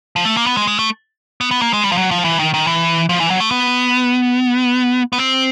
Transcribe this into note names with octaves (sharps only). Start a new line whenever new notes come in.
F3
A3
A#3
B3
G#3
G#3
A3
B3
B3
A#3
G#3
G3
F3
F#3
F3
E3
D#3
D#3
E3
F3
E3
F#3
A3
B3
B3
C4